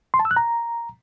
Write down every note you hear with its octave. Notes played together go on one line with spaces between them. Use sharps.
C6
A5
E6
F#6
A#5